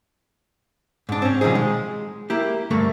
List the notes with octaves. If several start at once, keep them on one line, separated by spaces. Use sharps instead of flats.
G#2 D4
C4 C#4
B2 D#3 F3 G3 D#4 G#4
G#3
A#3 E4 G4
D2 G2 A3 A#3